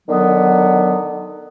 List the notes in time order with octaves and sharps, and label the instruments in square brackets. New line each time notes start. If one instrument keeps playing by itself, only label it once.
[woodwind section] D3 D#3 F#3 B3